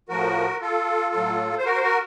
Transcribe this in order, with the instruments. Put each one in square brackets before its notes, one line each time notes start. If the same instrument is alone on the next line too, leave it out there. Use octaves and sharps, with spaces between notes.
[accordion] A2 F3 F#4 A#4
F4 A4
A2 F#3
C5
F#4 A#4
C5
F#4 A#4